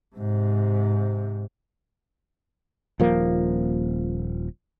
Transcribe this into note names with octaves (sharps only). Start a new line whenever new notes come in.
G#2 C3
D#1 F3 A#3